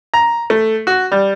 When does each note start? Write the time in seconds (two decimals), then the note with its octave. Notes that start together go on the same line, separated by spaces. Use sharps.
0.14 A#5
0.50 A3
0.87 F#4
1.12 G3